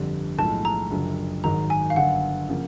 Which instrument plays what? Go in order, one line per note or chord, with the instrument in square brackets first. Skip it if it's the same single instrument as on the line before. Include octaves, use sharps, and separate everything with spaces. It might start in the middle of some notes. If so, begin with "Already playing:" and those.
Already playing: [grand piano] G1 F2 D3 G3
[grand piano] B1 A2 F3 G#3 [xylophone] A5
[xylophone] A#5
[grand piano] F#1 F#2 D3 F3
[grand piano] G#1 G#2 D#3 F#3 [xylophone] A#5
[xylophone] G#5
F5
[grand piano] G1 F#2 D3 [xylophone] F#5
[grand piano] C#3 F3 A#3